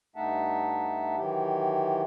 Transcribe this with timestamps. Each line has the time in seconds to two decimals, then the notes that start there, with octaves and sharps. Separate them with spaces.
0.16 G2 A3 D#4 E5 F#5 A5
1.17 D#3 E3 F#3 E4 G4